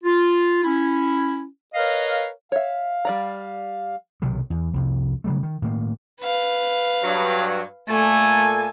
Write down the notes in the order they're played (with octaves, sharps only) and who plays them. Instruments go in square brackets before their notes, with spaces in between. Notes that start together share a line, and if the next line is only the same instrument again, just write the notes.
[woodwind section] F4
C#4 E4
A#4 B4 C#5 D#5 F5
[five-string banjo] C#5 E5 [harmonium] F5
[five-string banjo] G3 D5 A#5
[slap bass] B1 C3 D#3 F#3
E2
C2 F2 C3
C#3 F#3 G3 A3
D#3
A2 D#3 A#3
[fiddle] B4 F5
[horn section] G2 F#3
[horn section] A#2 A4 G#5 [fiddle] A3